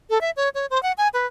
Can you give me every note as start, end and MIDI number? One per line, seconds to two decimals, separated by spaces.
0.10 0.21 69
0.21 0.31 76
0.37 0.49 73
0.55 0.66 73
0.70 0.81 72
0.83 0.92 78
0.98 1.08 80
1.14 1.26 71